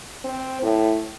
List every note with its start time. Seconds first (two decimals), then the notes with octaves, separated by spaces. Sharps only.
0.24 C4
0.62 A2